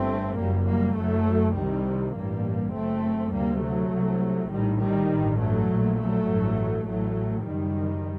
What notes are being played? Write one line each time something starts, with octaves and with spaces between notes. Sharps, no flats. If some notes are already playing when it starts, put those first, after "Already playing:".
Already playing: G1 G2 A3 C4
F#1 F#2 G3 A#3
G3 A#3
F#1 F#2 F#3 A3
C2 C3 D#3 G3
A1 G2 G3 A#3
F#1 F#2 A3 C4
D2 C3 G3 A#3
F#3 A3
C2 C3
A#1 A2 D#3 G3
D#3 G3
A1 G2
F#3 A3
A#1 A#2
F#3 A3
A1 G2
A1 A2 F#3 A3
F#1 F#2 D#3 G3